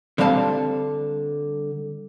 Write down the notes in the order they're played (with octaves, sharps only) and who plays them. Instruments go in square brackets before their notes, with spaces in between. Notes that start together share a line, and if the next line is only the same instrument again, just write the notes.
[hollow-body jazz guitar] D3 G3 C4 F5 A5